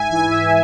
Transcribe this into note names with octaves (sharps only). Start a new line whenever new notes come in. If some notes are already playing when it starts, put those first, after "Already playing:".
Already playing: G#2 E5 G#5
E3 G#5
E5